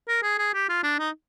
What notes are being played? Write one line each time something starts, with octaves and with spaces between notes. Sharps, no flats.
A#4
G#4
G#4
G4
F4
D4
D#4